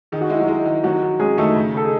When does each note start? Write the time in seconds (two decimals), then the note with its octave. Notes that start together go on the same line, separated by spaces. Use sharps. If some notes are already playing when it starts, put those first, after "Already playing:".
0.12 D#3 G#4
0.21 F#4
0.30 G#3 E4
0.40 F#3 F#4
0.48 G#3
0.66 D#3
0.83 D#3 F#3 F#4
1.02 D#3
1.20 G#3 C#4 G#4
1.37 D#3 A3 A4
1.56 C#3
1.74 C#3 A4
1.84 G#4